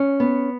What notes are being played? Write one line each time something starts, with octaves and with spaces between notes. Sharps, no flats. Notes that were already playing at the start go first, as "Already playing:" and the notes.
Already playing: C#4
B3